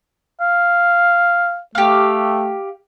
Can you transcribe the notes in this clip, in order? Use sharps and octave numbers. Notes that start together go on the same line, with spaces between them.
F5
A3 G4 F5